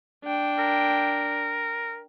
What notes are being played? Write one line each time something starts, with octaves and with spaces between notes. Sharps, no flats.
D4 G5
A#4